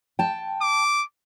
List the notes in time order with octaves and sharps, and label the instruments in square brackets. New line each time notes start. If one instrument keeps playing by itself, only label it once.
[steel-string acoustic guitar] G5 A5
[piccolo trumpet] D6